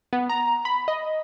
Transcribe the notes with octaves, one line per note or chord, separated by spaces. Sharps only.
B3
A#5
B5
D#5